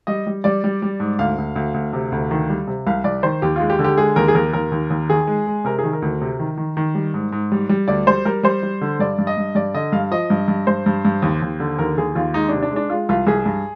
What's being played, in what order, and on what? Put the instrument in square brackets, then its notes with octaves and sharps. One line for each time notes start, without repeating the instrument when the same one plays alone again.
[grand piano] G3 D#5
G3
G3 D5
G3
G3
G#2
D2 F5
D2
D2
D2
C3
D2
D#3
G3
C3
C2 F5
C2 D5
D#3 C5
D#2 G4
G#3 F4
G4
D3
G4
G#3 G#4
D#2 A#4
G#4
D#2 A#4
D#2 A#4
D#2
D#2
D#3 G#4
G#3
G#3
C3 A#4
G#4
D#3
A#4
D2
C3
D#3
D#3
D#3
G3
G#2
G#2
G3
G3
D2 D5
G3 C5
G3 A#4
G3 C5
G3
D3
G2 D5
G2
D#5
G2
G2 D5
D3 D#5
G2 F5
F3 D#5
G2
G2
G2 C5
G2
G2
D#2
D#2
D3
D#2 A#4
D#2 G#4
D#2 F4
G#3 D#4
D4
C3
D4
G#3
D4
G#3 F4
C2 F4
C2 G#4
G2